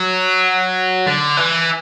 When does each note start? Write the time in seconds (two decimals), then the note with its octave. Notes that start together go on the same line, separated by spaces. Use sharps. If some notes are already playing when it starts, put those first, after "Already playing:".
Already playing: F#3
1.07 D3
1.37 E3